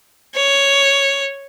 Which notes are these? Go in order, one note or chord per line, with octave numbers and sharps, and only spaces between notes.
C#5